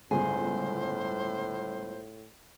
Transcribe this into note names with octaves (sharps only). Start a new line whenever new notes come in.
G1 C#2 A2 G#4 C5